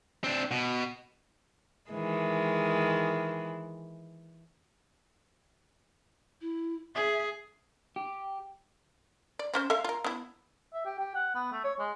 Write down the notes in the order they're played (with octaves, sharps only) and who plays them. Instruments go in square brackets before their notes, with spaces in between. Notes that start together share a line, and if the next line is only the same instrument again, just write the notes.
[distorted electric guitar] C4 D4
B2
[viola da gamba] D#3 E3 G#3
[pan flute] E4
[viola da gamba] G#4 [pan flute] E5
[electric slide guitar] G4
[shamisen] D5
C4 C#4 C5
A4 E5 F5
F4 A#4
B3 E4
[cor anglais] E5
G4
G4
F#5
B3
A3
C#5
G#3